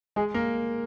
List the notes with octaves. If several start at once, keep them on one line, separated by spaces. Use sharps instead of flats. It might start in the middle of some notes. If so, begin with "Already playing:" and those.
G#3 G#4
A#3 A#4